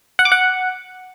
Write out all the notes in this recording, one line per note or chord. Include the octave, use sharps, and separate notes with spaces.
F#5
D6
F#5